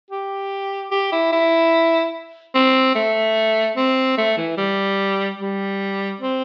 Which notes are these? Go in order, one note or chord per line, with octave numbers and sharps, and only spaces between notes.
G4
G4
E4
E4
C4
A3
C4
A3
E3
G3
G3
C4